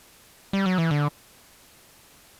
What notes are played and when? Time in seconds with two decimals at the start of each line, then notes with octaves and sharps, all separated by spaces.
0.53 G3
0.66 F#3
0.78 E3
0.91 D3